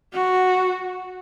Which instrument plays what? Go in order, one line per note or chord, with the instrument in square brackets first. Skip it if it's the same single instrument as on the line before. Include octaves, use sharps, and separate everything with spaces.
[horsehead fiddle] F#4